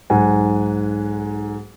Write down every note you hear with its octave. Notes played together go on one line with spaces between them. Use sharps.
B1 G#2 F#5 G#5